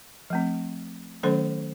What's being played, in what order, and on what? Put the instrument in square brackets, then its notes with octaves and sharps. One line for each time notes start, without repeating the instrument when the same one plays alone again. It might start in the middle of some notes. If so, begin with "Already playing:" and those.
[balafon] F3 A3 C4
D#3 F#3 A3 C#4 A4 C5